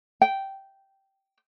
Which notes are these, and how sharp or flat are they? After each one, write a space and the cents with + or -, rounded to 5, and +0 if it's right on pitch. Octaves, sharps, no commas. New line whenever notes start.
G5 -10